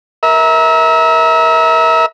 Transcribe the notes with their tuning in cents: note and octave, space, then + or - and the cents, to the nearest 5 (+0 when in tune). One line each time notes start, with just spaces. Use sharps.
A#4 +10 E5 -30